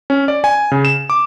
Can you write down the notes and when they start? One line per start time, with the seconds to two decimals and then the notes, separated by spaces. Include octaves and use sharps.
0.10 C#4
0.28 D5
0.44 G#5
0.71 C#3
0.85 E7
1.10 D6